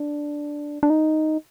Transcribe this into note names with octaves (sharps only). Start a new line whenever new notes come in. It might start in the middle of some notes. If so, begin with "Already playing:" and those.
Already playing: D4
D4
D#4